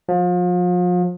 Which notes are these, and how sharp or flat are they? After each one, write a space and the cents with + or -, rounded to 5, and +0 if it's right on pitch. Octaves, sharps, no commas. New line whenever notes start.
F3 +35